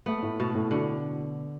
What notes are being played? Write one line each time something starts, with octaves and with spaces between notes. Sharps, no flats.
A3 B3
A2
B2 A3
A2
D3 F#4